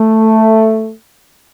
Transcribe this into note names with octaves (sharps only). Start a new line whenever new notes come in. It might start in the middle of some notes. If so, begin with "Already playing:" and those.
Already playing: A3